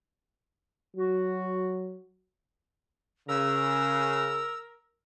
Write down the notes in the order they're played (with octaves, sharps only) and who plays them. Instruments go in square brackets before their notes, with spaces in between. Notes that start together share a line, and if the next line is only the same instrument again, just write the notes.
[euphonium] F#3 [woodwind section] F#4
[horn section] C#3 [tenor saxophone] A#4 [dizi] E6